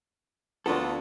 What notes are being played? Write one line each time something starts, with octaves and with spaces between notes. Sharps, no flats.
D2 A#3 B3 D4 F4 A4